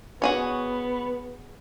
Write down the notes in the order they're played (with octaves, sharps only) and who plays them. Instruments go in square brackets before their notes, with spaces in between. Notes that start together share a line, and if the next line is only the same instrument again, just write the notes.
[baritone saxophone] B3 [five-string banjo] F#4 G#4 C#5